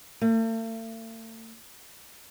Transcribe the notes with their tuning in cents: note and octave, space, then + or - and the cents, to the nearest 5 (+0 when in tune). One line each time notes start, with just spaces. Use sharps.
A3 +45